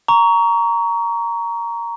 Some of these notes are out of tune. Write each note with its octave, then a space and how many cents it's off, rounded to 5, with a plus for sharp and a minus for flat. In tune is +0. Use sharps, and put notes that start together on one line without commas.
A#5 +0 C#6 +25